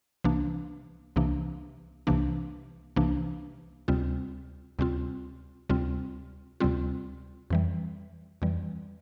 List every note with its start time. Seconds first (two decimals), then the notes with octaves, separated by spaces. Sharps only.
0.24 C2 C3 E3 A#3 D4
1.16 C2 C3 E3 A#3 D4
2.07 C2 C3 E3 A#3 D4
2.96 C2 C3 E3 A#3 D4
3.88 D2 C3 G3 C4 F4
4.79 D2 C3 G3 C4 F4
5.69 D2 C3 G3 C4 F4
6.60 D2 C3 G3 C4 F4
7.50 F2 E3 G3
8.42 F2 E3 G3